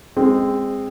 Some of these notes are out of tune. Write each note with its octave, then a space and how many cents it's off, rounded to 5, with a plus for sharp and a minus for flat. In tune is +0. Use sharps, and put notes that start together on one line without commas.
G#3 -20 C4 +0